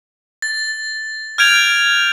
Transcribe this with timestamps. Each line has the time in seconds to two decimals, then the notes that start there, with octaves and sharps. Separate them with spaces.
0.42 A6
1.38 F6 G6 G#6 D7 F7